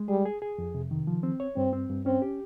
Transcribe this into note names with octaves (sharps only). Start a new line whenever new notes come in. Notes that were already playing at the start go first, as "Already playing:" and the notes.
Already playing: G#3
G3 G#4
G#4
G#4
F2
C3
D#3
F3
C4
C#5
G2 C4
C4
G2
C4 C#4
G4